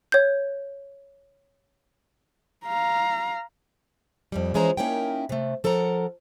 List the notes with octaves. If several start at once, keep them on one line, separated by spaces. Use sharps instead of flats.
C#5 G6
F5 A#5
F2 A#2 G3
E3 F3 G#3 C#4 C5 A#5
A#3 C#4 D#4 E4 A#4 G5
C3 A3
F3 A4 A#4 F#5 A#5